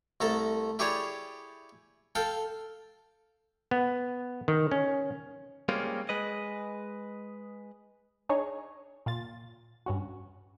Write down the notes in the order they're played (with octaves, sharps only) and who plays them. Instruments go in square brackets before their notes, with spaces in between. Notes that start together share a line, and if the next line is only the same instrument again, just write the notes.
[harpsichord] C2 A3 A4 A#5
E4 G4 G#4 C#5 D5
A4 F5 G5
[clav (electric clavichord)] B3
D#3
C#4
[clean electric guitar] G3 G#3 A#3 C4 C#4 F4
G#3 B4 D#5
[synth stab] D4 D#4 G#4 C#5
A#2 F4 A6
G2 C#4 F#4